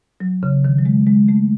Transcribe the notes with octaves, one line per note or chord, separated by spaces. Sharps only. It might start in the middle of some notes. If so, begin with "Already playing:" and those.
F#3
C#3
D#3
F#3
G#3
G#3
A3